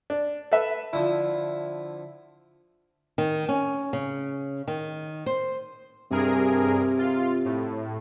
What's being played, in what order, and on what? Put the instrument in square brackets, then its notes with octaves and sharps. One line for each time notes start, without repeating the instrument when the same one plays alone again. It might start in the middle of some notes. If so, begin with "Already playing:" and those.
[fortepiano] D4
A4 B4 E5
[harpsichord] D3 F3 [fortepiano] E4
[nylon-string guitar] D#3
C#4
C#3
D#3
C5
[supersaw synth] G2 G#4 A#4 [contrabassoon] C3
[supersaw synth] F4
A2